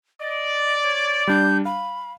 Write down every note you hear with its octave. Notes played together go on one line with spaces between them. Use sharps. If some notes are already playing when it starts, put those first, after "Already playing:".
D5 D#5
C#5
G3 D4 G6
F5 B5